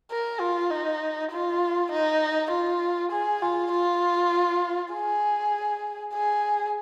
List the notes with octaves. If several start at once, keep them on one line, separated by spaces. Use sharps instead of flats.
A#4
F4
D#4
F4
D#4
F4
G#4
F4
F4
G#4
G#4